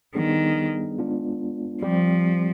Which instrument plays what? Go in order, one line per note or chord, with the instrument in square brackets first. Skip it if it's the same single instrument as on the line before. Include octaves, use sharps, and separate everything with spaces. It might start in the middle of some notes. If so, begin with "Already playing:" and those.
[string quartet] D#3 [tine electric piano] G3 B3 D4 G#4
[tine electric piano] G#3 B3 D4 F4
[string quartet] F3 [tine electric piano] G3 C4 G4